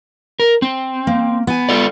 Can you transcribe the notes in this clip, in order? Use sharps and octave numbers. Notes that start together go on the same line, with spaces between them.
A#4
C4
A#3
B3 G#5
F4 A4 D5